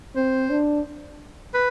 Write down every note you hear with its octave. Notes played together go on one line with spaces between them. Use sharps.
C4 C5
D4
B4